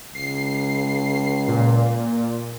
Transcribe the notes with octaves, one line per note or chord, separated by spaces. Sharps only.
C#2 C7
A#2